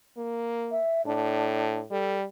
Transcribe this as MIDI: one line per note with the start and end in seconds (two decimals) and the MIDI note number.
0.17 0.80 58
0.71 1.02 76
1.06 1.84 45
1.06 1.79 62
1.91 2.25 55
1.91 2.17 69